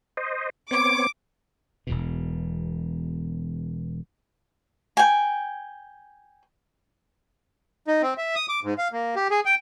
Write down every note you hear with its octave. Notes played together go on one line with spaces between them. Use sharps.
C5 D#5
B3 C4 C#5 D6
E1 E2 B2
G5 G#5
D#4
C4
E5
D#6
D6
G#2
F5
A#3
G4
G#4
G5